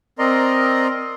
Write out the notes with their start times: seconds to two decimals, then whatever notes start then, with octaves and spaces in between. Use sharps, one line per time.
0.19 C4 A#4 D5 D#5 A#5 C6